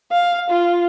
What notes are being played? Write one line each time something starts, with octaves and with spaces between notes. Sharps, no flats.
F5
F4